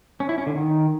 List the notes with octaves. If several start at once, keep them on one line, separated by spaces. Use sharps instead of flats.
C#4
E4
C#4
D3
D#3